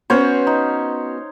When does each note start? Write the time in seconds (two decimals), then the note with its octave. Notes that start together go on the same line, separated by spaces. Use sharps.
0.10 B3 C#4 F#4 C5 C#5 F5
0.47 D#4